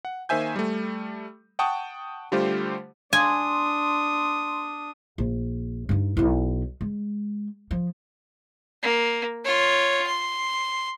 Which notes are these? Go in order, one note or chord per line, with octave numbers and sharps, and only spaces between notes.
F#5
D#3 A#3 C5 E5 G#5 G6
G3 A3
F#5 G5 A5 C#6 D#6
D3 G3 A3 F4 G4 C5
D4 G#5 C6 D#6
A#1
G2 D#4
B1 E4
G#3
F3
A#3
F4 C#5
C6